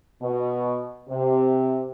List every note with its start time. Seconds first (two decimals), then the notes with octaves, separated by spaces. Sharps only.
0.21 B2
1.09 C3